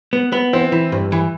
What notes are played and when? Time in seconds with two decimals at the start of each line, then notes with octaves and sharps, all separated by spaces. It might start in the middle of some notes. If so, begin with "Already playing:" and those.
0.13 B3
0.32 B3
0.53 E3 C4
0.72 E3
0.92 G2
1.12 E3